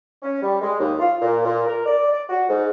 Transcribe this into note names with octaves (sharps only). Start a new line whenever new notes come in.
C#4
G3
G#3
D#2
F4
A#2
A#2
A#4
D5
D5
F#4
G#2